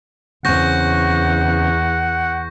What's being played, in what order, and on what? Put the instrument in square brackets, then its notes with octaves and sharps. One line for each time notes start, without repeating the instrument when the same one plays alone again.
[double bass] E2 [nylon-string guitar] C#3 C4 [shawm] F#5 [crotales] C#6 G6 A#6